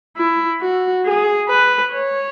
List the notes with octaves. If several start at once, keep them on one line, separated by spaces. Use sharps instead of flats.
E4
F#4
G#4
B4
C#5